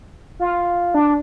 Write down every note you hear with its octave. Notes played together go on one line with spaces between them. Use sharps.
F4
D4